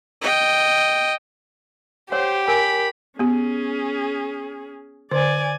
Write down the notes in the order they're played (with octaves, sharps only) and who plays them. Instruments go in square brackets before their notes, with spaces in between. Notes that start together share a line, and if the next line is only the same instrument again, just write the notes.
[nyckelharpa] D#5 G5
[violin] G4 [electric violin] C5 [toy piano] C#5 F#5
[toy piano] A#4 G#5 [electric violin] B5
[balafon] B3 G4 [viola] C#4 G#4
[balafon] D3 C5 [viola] D5 G#5